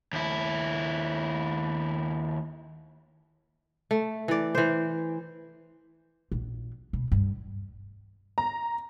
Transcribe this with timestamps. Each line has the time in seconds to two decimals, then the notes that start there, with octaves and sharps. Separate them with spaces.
0.13 D#2 E4
3.91 A3
4.28 E3 D5
4.55 E3 C5
6.32 A#1
6.93 B2
7.12 G2
8.38 A#5